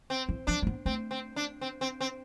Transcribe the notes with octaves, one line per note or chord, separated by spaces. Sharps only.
C4
E3
F3 D4
A3
B3
A3 C4
C4
D4
C4
C4
C4